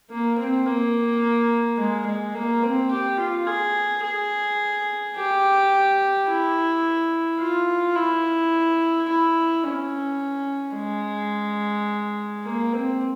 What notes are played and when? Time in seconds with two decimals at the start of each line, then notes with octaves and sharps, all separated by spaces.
0.11 A#3
0.39 C4
0.67 A#3
1.78 G#3
2.07 G#3
2.35 A#3
2.63 C4
2.91 G4
3.19 F4
3.47 G#4
4.04 G#4
5.16 G4
6.28 E4
7.40 F4
7.96 E4
9.08 E4
9.64 C#4
10.76 G#3
12.44 A#3
12.73 C4